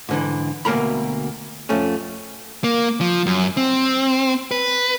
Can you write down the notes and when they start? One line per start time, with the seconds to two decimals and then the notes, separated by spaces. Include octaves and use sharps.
0.09 G#2 D3 E3
0.65 D2 B2 A#3 A#4 A#5 B5
1.69 F2 A3 C#4
2.64 A#3
3.01 F3
3.26 F#2
3.57 C4
4.51 B4